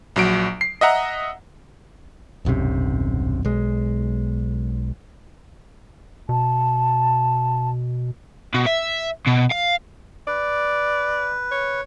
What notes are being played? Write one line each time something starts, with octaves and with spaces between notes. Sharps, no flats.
A#1 F#3 D7
C7
D#5 E5 F#5 A#5
D#1 B1 F#2 C3
B1 G#3
B2 A5
B2
E5
B2
F5
B4 D5
C#5